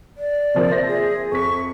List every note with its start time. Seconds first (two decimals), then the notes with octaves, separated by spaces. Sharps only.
0.17 D5
0.54 C3 F3 A#3
0.71 C5 E5 A#6
0.88 G#4
1.32 F2 C#6 B6